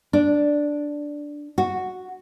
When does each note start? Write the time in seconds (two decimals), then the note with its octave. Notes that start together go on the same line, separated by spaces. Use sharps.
0.13 D4
1.58 F#4